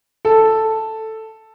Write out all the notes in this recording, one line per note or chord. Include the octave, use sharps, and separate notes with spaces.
A4